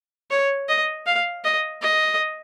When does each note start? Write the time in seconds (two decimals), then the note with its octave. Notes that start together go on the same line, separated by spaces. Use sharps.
0.31 C#5
0.69 D#5
1.06 F5
1.44 D#5
1.82 D#5